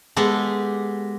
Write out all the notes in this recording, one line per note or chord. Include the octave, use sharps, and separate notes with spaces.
G#3 B3 G4 A4